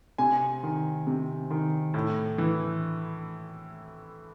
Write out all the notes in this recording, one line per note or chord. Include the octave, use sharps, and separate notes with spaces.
C3 G#5
D#3
C3
D#3
A2
E3